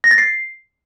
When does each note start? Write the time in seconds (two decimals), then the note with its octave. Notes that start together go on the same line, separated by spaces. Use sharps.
0.04 A#6
0.11 A6
0.18 C7